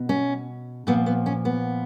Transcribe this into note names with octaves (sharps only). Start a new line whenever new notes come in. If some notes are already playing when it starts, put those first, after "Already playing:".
Already playing: B2
C#4
A#2 F3 B3
B3
C#4
B3